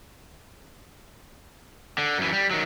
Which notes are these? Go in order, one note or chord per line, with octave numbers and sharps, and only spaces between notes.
D3
F#2 E3
G3
D#3 F#3